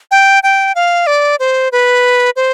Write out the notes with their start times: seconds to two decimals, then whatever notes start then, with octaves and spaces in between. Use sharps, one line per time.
0.11 G5
0.43 G5
0.75 F5
1.07 D5
1.40 C5
1.72 B4
2.36 C5